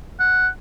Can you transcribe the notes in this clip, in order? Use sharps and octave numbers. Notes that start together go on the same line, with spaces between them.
F#5